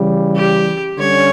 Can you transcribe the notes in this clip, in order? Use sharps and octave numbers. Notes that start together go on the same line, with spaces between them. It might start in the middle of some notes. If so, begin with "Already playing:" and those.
Already playing: C#3 E3 G3
G4
D3 G3 C#4 C#5